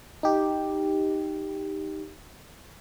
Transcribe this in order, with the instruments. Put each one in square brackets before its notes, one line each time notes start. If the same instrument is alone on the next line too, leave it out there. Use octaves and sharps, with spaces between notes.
[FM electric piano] D#4 G4